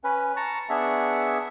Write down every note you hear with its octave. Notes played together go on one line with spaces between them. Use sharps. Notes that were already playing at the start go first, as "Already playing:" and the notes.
C#4 B4
A5 A#5 C#6
B3 D4 G#4 E5 C#6